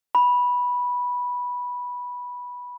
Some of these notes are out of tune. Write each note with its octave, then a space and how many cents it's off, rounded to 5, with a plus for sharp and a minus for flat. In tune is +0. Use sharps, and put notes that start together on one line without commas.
B5 -10